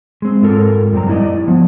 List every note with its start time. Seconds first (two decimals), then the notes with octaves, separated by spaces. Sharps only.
0.22 G#3 C4
0.42 G#2 F4 A4 A#4
0.93 F#2 G3 C4 A#5
1.07 G3 A3 E4 D5 D#5
1.48 F3 B3